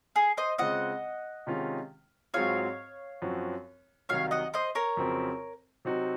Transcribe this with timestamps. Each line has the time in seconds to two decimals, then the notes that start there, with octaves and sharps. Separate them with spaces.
0.16 G#4
0.37 C5 D#5
0.58 C#3 G#3 C4 F4 D#5 F#5
1.47 C3 D#3 G#3 C#4 F4
2.34 G#2 F#3 C4 F4 G#4 C#5 F5
3.22 F#2 F3 C4 F#4
4.09 C2 C3 D#3 F#3 C#5 F5
4.31 D#5 F#5
4.54 C5 D#5
4.75 A#4 C#5
4.97 F2 C#3 F#3 C4
5.85 C3 F#3 C4 D#4 F#4